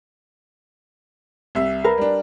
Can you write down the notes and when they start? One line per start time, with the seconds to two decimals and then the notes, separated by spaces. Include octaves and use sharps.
1.55 C2 E5
1.84 A#4 B4
1.98 G3 D4